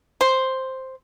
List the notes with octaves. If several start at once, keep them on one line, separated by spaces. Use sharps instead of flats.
C5